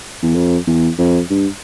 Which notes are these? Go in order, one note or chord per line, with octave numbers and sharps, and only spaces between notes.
E2
F2
E2
F2
G2